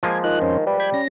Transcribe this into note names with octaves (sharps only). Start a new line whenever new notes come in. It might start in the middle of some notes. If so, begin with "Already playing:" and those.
F3 G#3 A#3 G#5
D#3 F4 F#6
F2 C#4 C5
G3 B4
G5 B5 G#6
C#4 A#6